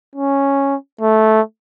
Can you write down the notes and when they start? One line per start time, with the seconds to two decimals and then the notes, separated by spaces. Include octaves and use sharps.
0.16 C#4
1.01 A3